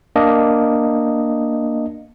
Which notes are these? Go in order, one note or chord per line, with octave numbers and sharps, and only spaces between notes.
A#3 D4 D#5